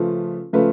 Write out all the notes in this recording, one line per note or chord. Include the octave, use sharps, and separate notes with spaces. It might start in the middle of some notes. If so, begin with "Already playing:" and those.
Already playing: C#3 F3 A3 F4 B4
C#3 F3 A3 F4 B4